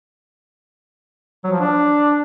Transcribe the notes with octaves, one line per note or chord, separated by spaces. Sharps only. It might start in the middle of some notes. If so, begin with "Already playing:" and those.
F#3
F3
D4